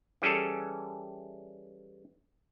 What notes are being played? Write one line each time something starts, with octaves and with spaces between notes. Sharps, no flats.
E3 G3 C#4 G#4 A4